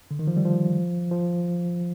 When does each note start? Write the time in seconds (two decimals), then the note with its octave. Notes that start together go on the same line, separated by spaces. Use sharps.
0.11 D3
0.19 D#3
0.27 F3
0.37 G3
0.45 F3
1.11 F3